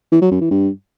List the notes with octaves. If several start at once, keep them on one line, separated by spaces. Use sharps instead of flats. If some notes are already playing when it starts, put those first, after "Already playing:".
E3
F#3
F#2
E3
G2